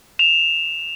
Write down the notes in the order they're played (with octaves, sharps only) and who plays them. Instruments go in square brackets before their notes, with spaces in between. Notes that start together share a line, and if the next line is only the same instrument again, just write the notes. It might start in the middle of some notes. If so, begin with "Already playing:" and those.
[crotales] E7 F7